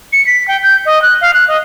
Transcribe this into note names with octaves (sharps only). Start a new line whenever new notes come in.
C#7
B6
G5
G6
D#5
F#6
F5
F#6
D#5